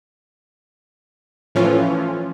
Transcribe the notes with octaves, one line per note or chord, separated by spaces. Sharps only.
A2 E3 F3 C#4 F4